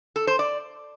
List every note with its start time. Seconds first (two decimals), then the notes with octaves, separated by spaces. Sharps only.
0.16 A4
0.27 C5
0.39 D5